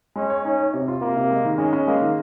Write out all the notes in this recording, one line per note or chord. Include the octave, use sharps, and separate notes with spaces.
G#3 C#4
C#5
C#4 D#4
C#5
C3
F4
C3 A#3
C3
G#3
D#3
G#3 C#4
C#4
G#3 A#3
D#3